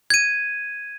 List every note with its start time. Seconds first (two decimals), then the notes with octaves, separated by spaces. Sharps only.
0.10 G#6 D#7